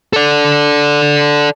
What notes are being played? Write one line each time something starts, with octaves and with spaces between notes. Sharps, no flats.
A4 D5